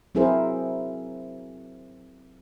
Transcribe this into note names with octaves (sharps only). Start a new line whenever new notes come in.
F#3 C4 E4 G#4 A#4 C5